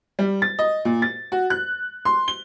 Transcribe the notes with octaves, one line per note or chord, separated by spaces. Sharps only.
G3
A6
D#5
A#2
A6
F#4
F#6
C6
G7